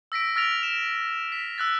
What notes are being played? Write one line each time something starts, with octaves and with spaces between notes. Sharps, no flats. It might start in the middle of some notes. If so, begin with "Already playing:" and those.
E6 A#6 B6 D7
E6 F6 A6 A#6 D7 F7
E7
B6
E6 F#6 A6